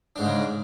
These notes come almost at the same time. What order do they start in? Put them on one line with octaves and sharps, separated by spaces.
D4 G#2 G#3 C#3